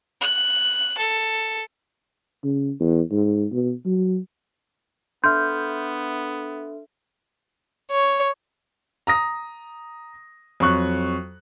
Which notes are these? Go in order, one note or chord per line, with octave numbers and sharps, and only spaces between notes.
F#6
A4
C#3
E2
G#2
B2
F#3
B3 D4 A4 E5 C6 F6 G6
C#5
A#5 D#6 A#6
F2 F#3 C#6 F#6